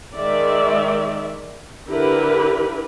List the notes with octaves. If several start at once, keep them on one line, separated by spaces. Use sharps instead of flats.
D#3 G#3 D5 E5
D3 E4 G4 A#4 B4 B5